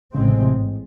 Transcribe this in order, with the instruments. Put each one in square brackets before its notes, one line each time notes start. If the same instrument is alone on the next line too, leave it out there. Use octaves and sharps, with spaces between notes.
[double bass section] A1 A2 G#3 C4 [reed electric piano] C#3
[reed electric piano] C3
C3
G#2